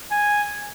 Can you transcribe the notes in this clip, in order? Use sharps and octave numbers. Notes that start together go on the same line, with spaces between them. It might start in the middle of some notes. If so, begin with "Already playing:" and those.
G#5